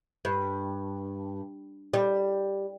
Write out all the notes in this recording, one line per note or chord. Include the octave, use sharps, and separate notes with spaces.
G2
G3